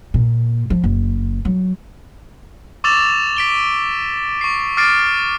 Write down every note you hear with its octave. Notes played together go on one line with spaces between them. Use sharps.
A#2
F3
F#1
F#3
C#6 D6 E6 A6 E7 F7
B6 D7 G7
C#6 C7
D6 F6 A6 C7 D7